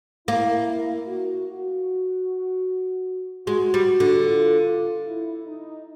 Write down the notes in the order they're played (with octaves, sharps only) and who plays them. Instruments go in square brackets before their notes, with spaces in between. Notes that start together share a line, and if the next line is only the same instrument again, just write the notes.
[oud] A#3 [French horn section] E4
[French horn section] F#4
F#4
[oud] G#3 [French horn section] F#4
[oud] G3
D3
[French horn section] F4
E4
D#4